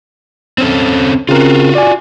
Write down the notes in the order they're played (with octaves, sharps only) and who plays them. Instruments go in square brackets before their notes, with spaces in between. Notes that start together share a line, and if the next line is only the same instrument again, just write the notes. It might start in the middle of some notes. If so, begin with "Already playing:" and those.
[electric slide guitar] C4 C#4 A4
[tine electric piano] C#3 C4 A#4 [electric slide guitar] F4 F#4
[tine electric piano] D5 G#5